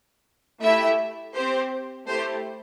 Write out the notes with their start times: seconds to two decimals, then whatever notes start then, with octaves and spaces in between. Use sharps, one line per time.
0.62 A3 E4 G4 E5
1.34 C4 G4 C5
2.08 A3 E4 G4 C5